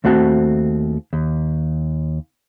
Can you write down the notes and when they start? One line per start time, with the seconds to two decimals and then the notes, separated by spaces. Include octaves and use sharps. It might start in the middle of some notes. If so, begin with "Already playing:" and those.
0.04 D#2 A3 C4 F#4 A5
1.13 D#2